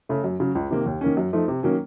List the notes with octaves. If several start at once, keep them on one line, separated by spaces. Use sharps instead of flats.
C#3 A3
F#2
C#3 F#3
C#2
C3 D#3 A#3
D#2
D#3 A#3 C#4
F#2
F3 A3 D#4
C3
D#3 F#3 A#3 C#4